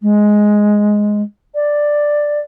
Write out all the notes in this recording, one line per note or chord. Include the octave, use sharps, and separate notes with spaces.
G#3
D5